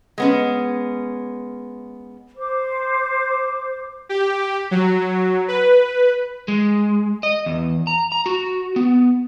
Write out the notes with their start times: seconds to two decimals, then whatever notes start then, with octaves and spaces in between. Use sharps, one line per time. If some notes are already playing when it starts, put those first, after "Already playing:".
0.18 G#3 B3 C#4
2.37 C5 D6
4.09 G4
4.71 F#3
5.48 B4
6.48 G#3
7.23 D#5
7.46 E2
7.87 A#5
8.12 A#5
8.26 F#4
8.76 B3